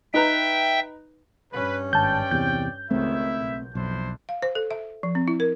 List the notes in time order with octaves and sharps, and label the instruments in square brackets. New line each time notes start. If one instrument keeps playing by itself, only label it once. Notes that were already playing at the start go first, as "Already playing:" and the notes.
[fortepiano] D#4 B4 A#5 [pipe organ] E5 G5
[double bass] G2 C#4 [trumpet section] B4
[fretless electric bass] G#1 [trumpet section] D5 G5 [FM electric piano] A5 G6
[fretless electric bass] E2 C3 [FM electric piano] G6
[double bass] C#2 D#3 [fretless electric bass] A3 C4 [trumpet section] E4 E5
[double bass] B1
[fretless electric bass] B1 [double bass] F2 [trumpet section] D4 E4 C5
[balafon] F5
C5
A4
E5
F3
C4
E4
A#4